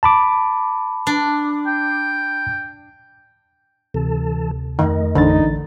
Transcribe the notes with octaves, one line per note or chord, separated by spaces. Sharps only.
A5 B5 D6
D4
G5
D2 C3 E3 A4 A5
F2 D#3 A3 D#5
A1 D3 E3 D#4 A6